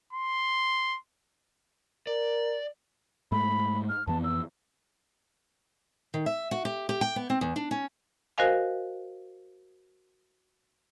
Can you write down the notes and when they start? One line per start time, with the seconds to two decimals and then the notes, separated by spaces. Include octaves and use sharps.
0.13 C6
2.07 A#4 D5
3.32 G#2 G#3 A3 B5
3.89 F6
4.07 F2 E3 B3 A5
4.24 E6
6.14 D#3
6.26 E5
6.51 F#4
6.65 G4
6.89 G4
7.01 G5
7.16 B3
7.30 C4
7.41 E2
7.56 D4
7.71 C#4
8.38 F#4 A#4 C5 D#5 F5 G#5